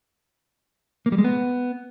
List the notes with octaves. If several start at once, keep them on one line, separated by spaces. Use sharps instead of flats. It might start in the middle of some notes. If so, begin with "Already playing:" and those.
A#3
G3
G#3
B3